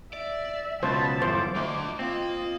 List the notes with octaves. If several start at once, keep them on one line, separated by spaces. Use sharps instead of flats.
D5 E5
C#2 B2 F#3 C5 A5 B5
G1 E2 C5 D6
D2 F4 D#5
A#3 C4 F4 D#5 F5